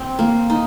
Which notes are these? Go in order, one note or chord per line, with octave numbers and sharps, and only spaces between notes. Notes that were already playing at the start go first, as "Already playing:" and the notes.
Already playing: C4
A#3
D#4